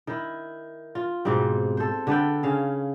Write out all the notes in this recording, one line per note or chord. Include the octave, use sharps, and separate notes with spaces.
D#3 E4
F4
G#2 B2 G3 C4
A4 C5
D3 A4 B4 G5
C#3 C#4 F5